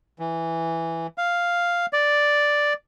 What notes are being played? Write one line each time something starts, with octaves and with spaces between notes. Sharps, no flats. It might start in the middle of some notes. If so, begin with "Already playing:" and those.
E3
F5
D5